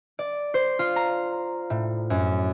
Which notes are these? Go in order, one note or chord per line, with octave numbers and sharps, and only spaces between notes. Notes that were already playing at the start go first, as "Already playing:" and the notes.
D5
C5
F4
A#5
A2
F#2